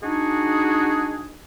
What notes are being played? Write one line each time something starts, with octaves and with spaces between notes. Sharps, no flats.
G#3 D4 D#4 F#4 G#4